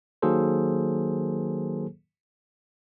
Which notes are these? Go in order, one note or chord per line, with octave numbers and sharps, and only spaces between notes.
D#3 F#3 A#3 G#4 A4 C5